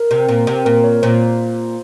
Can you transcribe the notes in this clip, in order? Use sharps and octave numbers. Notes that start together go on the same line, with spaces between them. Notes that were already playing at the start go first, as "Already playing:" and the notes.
Already playing: A#4
C3
A#2
C3
A#2 A#4
C#5
A#2 C5